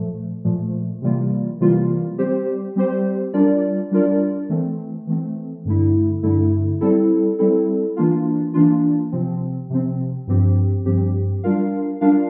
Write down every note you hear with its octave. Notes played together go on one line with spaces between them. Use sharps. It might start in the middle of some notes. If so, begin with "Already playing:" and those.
Already playing: A#2 F3 A3
A#2 F3 A3
C3 E3 G3 A#3 F4
C3 E3 G3 A#3 F4
G3 C4 G4 C5
G3 C4 G4 C5
G3 D4 F4 A#4 D5
G3 D4 F4 A#4 D5
E3 A3 C4
E3 A3 C4
G2 D3 A3 E4
G2 D3 A3 E4
G3 C4 E4 A4
G3 C4 E4 A4
E3 A#3 D4 F4
E3 A#3 D4 F4
C3 F3 C4
C3 F3 C4
G2 F3 C4 G4
G2 F3 C4 G4
G3 D4 F4 A#4 F5
G3 D4 F4 A#4 F5